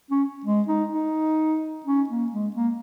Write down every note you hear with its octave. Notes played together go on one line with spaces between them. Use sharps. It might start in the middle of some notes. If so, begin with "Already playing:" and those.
C#4
G#3
D#4
D#4
C#4
A#3
G#3
A#3